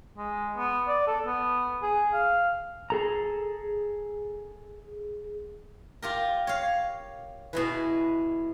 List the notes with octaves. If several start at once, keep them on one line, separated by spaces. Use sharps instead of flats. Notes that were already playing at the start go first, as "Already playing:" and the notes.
G#3
B3
D5
A4
B3
G#4
F5
G#4 A4 A#5
F4 G4 A#4
C#5 F5
B2 E3 G#3 E4 B4